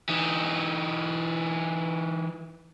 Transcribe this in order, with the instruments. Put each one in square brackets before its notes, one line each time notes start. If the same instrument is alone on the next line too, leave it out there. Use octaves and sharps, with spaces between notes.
[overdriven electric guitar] E3 D#4